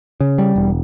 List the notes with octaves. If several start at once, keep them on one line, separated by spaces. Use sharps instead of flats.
C#3
G3
E1